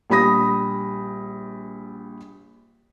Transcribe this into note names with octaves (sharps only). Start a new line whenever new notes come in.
A#1 G3 B5 D#6 A#6